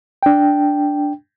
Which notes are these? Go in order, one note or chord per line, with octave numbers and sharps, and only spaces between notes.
D4 G5